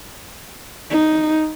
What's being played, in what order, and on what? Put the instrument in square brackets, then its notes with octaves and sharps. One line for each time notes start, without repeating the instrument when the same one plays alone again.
[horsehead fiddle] D#4